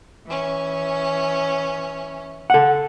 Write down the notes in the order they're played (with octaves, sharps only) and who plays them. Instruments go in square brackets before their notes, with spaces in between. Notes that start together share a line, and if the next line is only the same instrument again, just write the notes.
[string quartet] E3 C#4
[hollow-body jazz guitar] A4 F#5